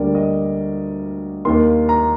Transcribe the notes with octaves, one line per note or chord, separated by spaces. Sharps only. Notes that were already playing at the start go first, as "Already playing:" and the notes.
Already playing: D2 D3 G3 A#3 D5
D#5
D#2 D#3 A#3 C6
A#5